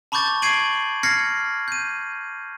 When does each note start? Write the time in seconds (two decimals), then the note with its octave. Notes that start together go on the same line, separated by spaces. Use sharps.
0.12 A5 B5 C#6 D6 G6 A6
0.42 C#6 G#6 C7 D7 D#7 F#7
1.03 F6 G#6 A#6 C7 C#7
1.68 G6 D#7